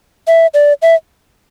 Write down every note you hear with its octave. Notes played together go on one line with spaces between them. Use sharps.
E5
D5
E5